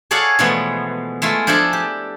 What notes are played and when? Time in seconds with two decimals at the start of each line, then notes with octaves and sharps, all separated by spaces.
0.11 G#4 A4 C#5 D5 F5 F#5
0.39 B2 E3 F3 G#3 A3 B3
1.22 G#3 A3 E4 F4
1.47 F3 D4 E4 G#4 A4 D5
1.73 G4